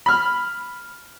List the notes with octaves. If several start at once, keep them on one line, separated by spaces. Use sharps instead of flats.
B5 F6